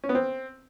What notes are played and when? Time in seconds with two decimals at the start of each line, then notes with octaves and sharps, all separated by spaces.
0.04 C#4
0.09 B3
0.15 C4